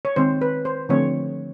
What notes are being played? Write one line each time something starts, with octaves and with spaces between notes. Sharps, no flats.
C#5
D#3 G#3 C4 C5
B4
C5
D3 F3 A3 C4 C#5